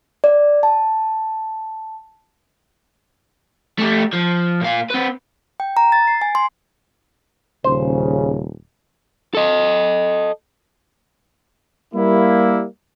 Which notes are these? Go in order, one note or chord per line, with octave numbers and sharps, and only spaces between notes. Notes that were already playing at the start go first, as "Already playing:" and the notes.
D5
A5
A3 G4
F3
A#2 F5
C4 B4
G5
A#5
A6
C7
G#5
C6
D#1 C#3 C5
A4 D#5
G3 A#3 E4